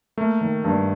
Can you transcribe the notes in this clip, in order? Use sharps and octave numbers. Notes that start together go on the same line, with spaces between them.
A3 A#3
D#3
G2